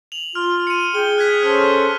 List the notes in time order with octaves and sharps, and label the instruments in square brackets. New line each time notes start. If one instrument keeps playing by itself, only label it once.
[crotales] F7 F#7
[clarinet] F4 [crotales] F6
[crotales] C#7 D#7
[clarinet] G#4 [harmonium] G5 [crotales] G7
[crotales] F#6 G#6 B6
[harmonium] C#4 A4 C5 [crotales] F6